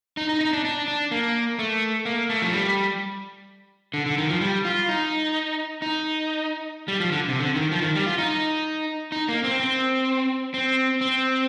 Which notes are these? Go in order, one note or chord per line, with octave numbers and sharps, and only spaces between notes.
D#4
D#4
D#4
D4
D4
D4
A#3
A3
A#3
A3
F3
G3
D3
D3
D#3
F3
G3
F4
D#4
D#4
G3
F3
D3
C3
D3
D#3
F3
D#3
G3
F4
D#4
D#4
A#3
C4
C4
C4
C4